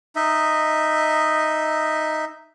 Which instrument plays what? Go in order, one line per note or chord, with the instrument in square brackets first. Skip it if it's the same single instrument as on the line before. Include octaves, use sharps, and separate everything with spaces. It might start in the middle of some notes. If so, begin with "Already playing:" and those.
[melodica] D#4 D#5 E5